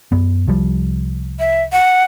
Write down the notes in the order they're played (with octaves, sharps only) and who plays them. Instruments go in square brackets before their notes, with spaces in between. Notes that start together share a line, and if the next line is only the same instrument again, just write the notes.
[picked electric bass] F#2 B3
C2 F3 G3
[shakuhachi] E5
F#5